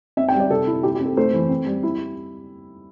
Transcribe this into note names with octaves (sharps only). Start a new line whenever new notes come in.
C4 E5
G5
G3
D5
C3 A4
E4
E4 G4
G4
C4
A4
A3 C5
E3
C4
G3
E4